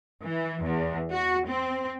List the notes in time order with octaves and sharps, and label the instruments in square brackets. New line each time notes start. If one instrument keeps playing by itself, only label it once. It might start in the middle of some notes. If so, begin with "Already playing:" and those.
[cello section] E3
E2
F#4
C4